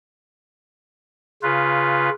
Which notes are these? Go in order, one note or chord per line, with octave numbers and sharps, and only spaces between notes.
C#3 F4 B4